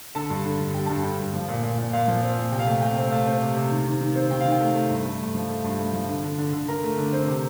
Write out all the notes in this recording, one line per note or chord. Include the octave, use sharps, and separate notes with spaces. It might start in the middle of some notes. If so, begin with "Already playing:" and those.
D3 A4 A5
G2
D3
G2
G3 G5
G2 A5
D3 G5
G2
F3
A#2
A#2
A#2
A#2 F5
F3
C4
A#2
C3 G5
F5
A3 G5
C3 G5
C4
A3 F5
C4
C3
C3
D#3
D#3
D#3
C4
D#3 G5
D#3 F5
G5
A3
A3
G2
A3
G2
F3
A3
G2
A3
F3
D3
D3
D3
D3
D3 A#4 A#5
A3
D3
C4
C3